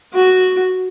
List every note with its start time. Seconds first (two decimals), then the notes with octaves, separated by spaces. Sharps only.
0.14 F#4